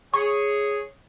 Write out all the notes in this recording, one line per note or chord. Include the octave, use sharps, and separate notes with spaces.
G#4 C#5 C#6